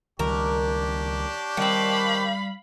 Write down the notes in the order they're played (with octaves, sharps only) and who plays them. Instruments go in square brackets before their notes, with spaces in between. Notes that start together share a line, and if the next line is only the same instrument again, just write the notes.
[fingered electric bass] C#2 D#3 G3 [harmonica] D4 G4 C#5 [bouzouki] A#4
[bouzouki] D#3 C4 [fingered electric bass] G3 [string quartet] F5 B5